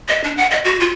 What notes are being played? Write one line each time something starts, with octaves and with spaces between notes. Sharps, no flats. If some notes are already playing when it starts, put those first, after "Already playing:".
D#5
D4
F#5
D#5
F#4
F4